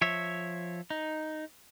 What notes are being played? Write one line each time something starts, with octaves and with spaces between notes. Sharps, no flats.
F3 C#5 E5
D#4